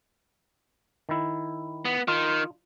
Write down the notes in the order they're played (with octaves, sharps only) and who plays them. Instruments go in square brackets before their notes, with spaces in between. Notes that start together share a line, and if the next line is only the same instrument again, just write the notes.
[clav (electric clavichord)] D#3 E4
[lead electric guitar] B3
[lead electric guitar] D#3 [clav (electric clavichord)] F4